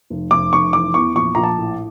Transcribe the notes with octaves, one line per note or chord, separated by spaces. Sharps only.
F1
F1 D6
F1 C#6
E3 D6
E2 C#6
A#1 C#6
A#1 A#5
A5
A2